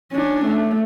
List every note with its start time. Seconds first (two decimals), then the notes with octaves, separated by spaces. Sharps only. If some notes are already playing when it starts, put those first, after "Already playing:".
0.12 C#4 D4
0.46 A3